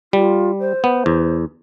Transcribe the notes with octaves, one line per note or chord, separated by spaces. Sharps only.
G3 F4
C5
B3
E2